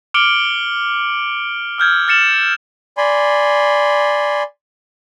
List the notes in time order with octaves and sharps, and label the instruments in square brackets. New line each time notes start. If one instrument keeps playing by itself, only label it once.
[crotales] D6 F6 C#7 D7 F#7 G7
E6 F6 G6 G#6
F6 A6 C#7 E7 F#7
[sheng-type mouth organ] D5 G#5 B5 C6